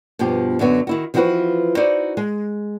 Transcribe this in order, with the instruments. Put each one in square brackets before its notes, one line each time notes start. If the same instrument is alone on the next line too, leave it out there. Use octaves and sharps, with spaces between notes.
[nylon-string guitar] G2 B2 F3 B3 G4
F#2 D3 F#3 B3
D#3 E4 F#4
E3 F3 B3 C4 F#4 B4
D#4 E4 F#4 C5 D5
G#3